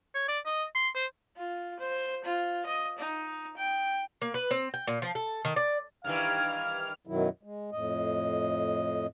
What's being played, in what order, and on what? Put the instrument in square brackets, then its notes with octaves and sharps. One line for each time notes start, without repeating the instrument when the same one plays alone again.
[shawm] C#5
D5
D#5
C6
C5
[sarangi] F4
C5
F4
D#5
D#4
G5
[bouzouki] A#3
B4
C4
G5
A#2
F3
A4
D#3
D5
[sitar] G2 D#3 E3 [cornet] F5 [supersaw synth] F6
[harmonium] F#2 B2 D#3 F#3 E4
G#3
F2 A2 D#5